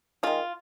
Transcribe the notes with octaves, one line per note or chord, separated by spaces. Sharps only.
D#3 G#3 F4